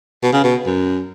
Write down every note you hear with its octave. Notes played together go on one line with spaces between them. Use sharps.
B2
C#3
B2
F#2